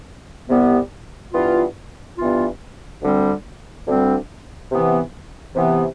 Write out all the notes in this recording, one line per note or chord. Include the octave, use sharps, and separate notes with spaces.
C2 C3 G3 B3
G2 E3 B3 F4
G2 E3 B3 F4
D2 D3 G3 C4
D2 D3 G3 C4
C3 E3 B3
C3 E3 B3